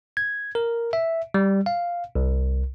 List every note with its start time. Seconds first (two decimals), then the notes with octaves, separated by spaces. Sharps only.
0.17 G#6
0.55 A#4
0.93 E5
1.34 G3
1.66 F5
2.15 C2